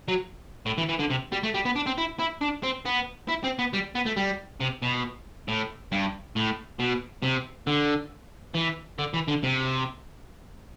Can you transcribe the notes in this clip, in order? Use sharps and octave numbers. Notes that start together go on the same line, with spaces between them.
F#3
A2
E3
E3
D3
C3
G3
A3
G3
B3
D4
C4
E4
E4
D4
C4
B3
E4
C4
B3
G3
B3
A3
G3
C3
B2
A2
G2
A2
B2
C3
D3
E3
D3
E3
D3
C3